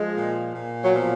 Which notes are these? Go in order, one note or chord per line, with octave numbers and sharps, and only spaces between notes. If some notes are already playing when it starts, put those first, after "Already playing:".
Already playing: F3 G#3
A#2
A#2
F#3
B2 F3